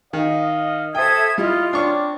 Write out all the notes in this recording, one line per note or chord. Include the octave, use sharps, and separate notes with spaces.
D#3 D#5 F5
A4 C5 E5 G5 D#6 G#6
G3 E4 F4 D#5 F5
C4 D4 C#5 D5 C#6